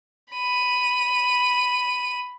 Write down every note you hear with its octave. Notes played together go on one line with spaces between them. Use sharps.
B5 D#7